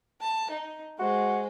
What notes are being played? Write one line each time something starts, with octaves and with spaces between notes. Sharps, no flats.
A5
D#4
G#3 F#4 C5